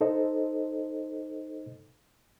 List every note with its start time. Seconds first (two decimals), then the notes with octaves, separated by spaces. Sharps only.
0.01 D#4 A4 C5 D#5